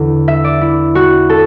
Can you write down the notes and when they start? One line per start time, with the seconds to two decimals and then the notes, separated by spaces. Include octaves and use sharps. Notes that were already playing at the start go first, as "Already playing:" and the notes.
Already playing: E2 D3
0.28 E5
0.44 D5
0.61 E4
0.95 F#4
1.29 A4